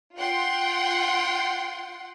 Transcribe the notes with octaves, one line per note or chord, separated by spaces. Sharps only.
F4 F#5 G5 C6